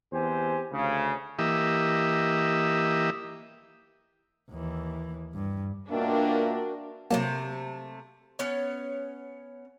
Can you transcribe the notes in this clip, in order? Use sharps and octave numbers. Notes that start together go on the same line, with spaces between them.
E2 C4 G4 C5 G#5
D2 C#3
E3 A#3 G4 D#5 E5
D#2 E3
G2
B2 A#3 D4 F4 F#4 A#4 E5 G5
C3 F#3 A3 A#3 A5
B3 C#4 C#5